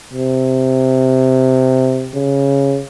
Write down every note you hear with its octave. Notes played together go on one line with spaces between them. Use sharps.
C3
C#3